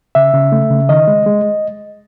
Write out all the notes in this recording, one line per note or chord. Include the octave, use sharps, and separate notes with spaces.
C#3 E5
C#3
A3
C#3
D#3 D#5
G#3
G#3